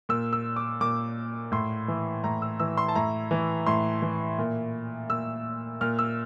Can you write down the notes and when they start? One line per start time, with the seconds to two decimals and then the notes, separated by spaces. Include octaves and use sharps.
0.09 A#2 E6
0.33 E6
0.56 D6
0.81 A#2 D6
1.52 A2 C6
1.88 E3
2.24 A2 A#5
2.42 E6
2.60 E3 E6
2.78 C6
2.89 A5
2.95 A2 A#5
3.31 E3
3.67 A2 C6
4.02 E3
4.38 A#2
5.10 A#2 E6
5.81 A#2 F6
5.99 E6